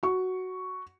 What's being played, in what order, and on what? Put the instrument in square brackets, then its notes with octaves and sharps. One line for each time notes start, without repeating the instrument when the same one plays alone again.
[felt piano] F#4 C#6